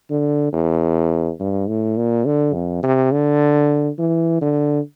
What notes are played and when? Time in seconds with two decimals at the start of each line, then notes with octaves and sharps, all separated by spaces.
0.11 D3
0.53 E2
1.40 G2
1.69 A2
1.98 A#2
2.26 D3
2.55 F2
2.83 C3
3.12 D3
3.99 E3
4.42 D3